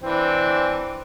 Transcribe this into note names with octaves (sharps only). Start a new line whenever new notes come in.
E3 C4 D4